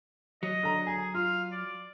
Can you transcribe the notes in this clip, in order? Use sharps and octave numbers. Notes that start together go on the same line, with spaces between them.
F#3 D#5
D3 A#5
G#4 G#5 A#5
F4 F5
D5